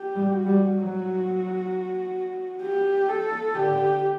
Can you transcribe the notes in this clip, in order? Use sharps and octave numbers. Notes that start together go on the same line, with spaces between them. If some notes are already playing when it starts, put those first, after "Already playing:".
Already playing: G4
G3
F#4
G3
F#3
G4
A4
D3 G4